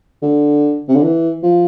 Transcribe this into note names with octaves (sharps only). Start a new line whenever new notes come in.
D3
C3
D3
E3
F3